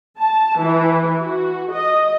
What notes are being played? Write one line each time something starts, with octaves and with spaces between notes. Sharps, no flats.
A5
E3
F#4
D#5